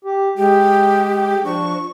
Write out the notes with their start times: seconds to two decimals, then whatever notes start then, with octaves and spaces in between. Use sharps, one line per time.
0.05 G4
0.38 G#3 G4
1.45 F3 D4 C#6